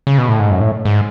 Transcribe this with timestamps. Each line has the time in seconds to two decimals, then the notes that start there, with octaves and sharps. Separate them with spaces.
0.07 C#3
0.18 B2
0.29 A2
0.39 G#2
0.51 F#2
0.61 A2
0.85 G#2